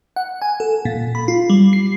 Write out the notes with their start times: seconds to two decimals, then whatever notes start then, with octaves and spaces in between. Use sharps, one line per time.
0.16 F#5
0.42 G#5
0.60 A4
0.85 A#2
1.15 B5
1.28 F4
1.50 G3
1.73 C7